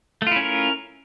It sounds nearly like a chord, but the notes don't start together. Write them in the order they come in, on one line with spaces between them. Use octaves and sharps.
A3 F4 E4 C#4 A#4